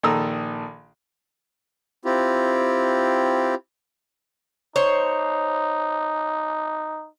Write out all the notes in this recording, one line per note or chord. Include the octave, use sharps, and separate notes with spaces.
A#1 D#3 A4 A#5 D#6 E6
C4 E4 F4 G4
D#4 C5 C#5